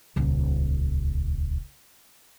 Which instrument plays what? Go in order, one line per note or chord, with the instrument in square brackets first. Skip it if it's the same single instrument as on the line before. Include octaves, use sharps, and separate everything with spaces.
[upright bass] D#1 C#2